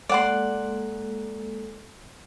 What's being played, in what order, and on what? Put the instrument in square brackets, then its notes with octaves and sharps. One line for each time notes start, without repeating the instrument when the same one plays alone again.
[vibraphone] G#3 A#3 A4 [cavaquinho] D5 F#5 C6